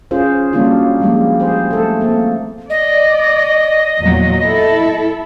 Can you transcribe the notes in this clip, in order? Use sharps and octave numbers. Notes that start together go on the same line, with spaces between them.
C#4 F4 G#4 C5
F#3 G3 A#3 C#4 D4 F4
E3 F3 G3 G#3 A#3
G#4 C5
A3 A4
A3 A#3 C4
D5 D#5
E2 A#2 F#3
E4 A4